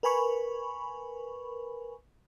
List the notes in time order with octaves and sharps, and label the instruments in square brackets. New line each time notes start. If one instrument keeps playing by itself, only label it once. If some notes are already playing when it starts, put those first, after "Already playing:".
[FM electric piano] A#4 B4 G#5 B5 C#6